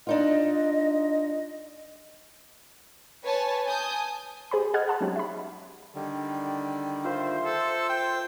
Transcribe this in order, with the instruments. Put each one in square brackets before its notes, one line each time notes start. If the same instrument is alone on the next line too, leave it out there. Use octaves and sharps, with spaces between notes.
[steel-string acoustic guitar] D4 D#4 F4 [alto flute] D#5
[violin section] B4 C#5 G#5 A5
G#5 A5 D#6 G6
[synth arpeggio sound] G4 G#4 C5 G#5 B5
G#4 D#5 F#5 F6 F#6 G#6
F#5 A5 B5
F#3 G#3 C#4 D#4 G4
E5 B5
[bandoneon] D3 D#3 G3
[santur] F4 A#4 E5 [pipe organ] C5
[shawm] A4
G5